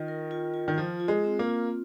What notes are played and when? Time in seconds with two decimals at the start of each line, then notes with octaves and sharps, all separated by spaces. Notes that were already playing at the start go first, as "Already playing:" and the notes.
Already playing: D#3 F4 D#5
0.08 A#4
0.31 F4
0.54 F4
0.68 D#3
0.78 F3 F4
1.00 F4
1.08 G#3
1.24 C4
1.39 A#3
1.47 F4